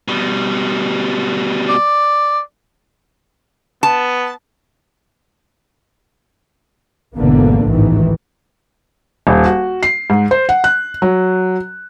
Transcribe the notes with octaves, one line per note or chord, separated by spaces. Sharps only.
B2 G3
D5
B3 A5
G#1 E2 B2 D3 A#3 B3
A1 D2 G#2 D#3 E3
D#1
F#4
C7
G#2
C5
F#5
F#6
F#3